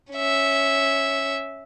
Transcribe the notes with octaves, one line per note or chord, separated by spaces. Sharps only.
C#4 E5